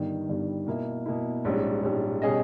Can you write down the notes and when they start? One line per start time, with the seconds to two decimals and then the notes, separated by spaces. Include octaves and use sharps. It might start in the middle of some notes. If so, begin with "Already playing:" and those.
Already playing: G1 G2 D#3 G3
0.28 G1 G2 D#3 G3
0.67 B2 A#3 E4
1.06 B2 A#3 E4
1.45 A#1 G#2 G3 C#4
1.83 A#1 G#2 G3 C#4
2.22 B2 G3 C#4 G#4 D#5